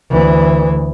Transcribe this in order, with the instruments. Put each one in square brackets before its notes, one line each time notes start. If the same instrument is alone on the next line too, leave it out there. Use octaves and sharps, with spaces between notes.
[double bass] D2 E3